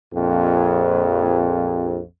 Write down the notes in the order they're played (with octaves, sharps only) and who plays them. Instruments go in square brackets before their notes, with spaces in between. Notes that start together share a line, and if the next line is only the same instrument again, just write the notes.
[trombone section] A#1 F2